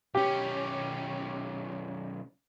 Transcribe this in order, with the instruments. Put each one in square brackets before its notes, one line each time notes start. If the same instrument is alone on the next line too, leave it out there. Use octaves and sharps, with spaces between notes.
[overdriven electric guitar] B1 C#4 [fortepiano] G4